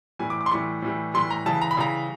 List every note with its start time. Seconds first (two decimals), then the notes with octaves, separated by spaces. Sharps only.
0.19 A2 E3 G3 G#5
0.30 D6
0.41 D6
0.46 C6
0.51 A2 E3 G3 C#6
0.82 A2 E3 G3
1.14 A2 E3 G3 C6
1.30 A#5
1.46 C#3 E3 G3 A5
1.61 A#5
1.71 B5
1.77 C#3 E3 G3 A#5